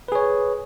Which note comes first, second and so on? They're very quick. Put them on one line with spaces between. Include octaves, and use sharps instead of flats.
B4 G#4 C#5